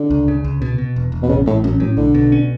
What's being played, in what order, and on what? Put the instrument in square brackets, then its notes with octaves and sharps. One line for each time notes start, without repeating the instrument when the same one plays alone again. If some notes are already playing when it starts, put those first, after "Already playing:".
Already playing: [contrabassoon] D3
[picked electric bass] C#2
C#3
C#2
B2
B2
E1
E1
[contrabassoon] B2
[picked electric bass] A1 [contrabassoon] C#3
[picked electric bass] A1 [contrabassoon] A2
[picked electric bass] A1 [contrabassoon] F#2
[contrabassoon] F#2 [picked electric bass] A2
[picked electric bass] B1 [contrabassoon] D3
[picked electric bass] B2
C#4